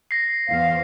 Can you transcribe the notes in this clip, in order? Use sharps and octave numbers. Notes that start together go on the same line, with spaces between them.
A#6 C7
E2 C5 F5